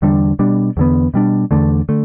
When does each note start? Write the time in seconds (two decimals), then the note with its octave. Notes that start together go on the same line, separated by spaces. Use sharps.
0.02 E2 D3 G3 D4
0.39 B2 G3 D4
0.77 E2 D3 B3
1.14 B2 G3 D4
1.51 E2 D3 A3 D4
1.89 D3 A3